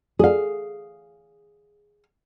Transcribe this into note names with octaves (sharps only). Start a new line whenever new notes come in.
G#4 F5